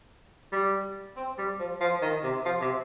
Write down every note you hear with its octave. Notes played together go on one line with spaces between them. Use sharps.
G3
C4
G3
F3
F3
D#3
C3
F3
C3